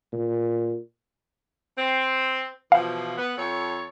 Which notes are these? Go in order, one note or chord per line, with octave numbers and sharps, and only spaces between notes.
A#2
C4
B2 E3 F3 F5
B3
F2 A4 C#5